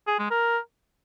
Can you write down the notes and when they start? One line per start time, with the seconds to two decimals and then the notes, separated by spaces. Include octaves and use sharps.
0.07 G#4
0.19 G#3
0.31 A#4